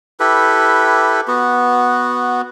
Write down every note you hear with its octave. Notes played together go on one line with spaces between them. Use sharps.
E4 G4 A4 B4
B3 F#4